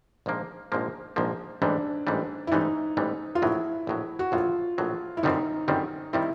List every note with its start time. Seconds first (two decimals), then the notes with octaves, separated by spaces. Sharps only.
0.26 A#1 G#2 F3 A#3
0.72 A#1 G#2 F3 A#3
1.16 A#1 G#2 F3 A#3
1.62 A1 G#2 E3 G3 D4
2.07 A1 G#2 E3 G3
2.47 E4
2.52 A1 G#2 E3 G3 D#4
2.97 A1 G#2 E3 G3
3.35 F4
3.42 A#1 A2 F#3 E4
3.87 A#1 A2 F#3
4.19 F#4
4.32 A#1 A2 F#3 F4
4.78 A#1 A2 F#3
5.17 E4
5.23 G1 F#2 D#3 G3 C4 D#4
5.68 G1 F#2 D#3 G3 C4
6.13 D#3 G3 C4 E4